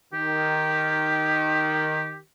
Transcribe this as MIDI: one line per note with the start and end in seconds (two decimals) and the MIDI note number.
0.13 2.19 51
0.13 2.19 67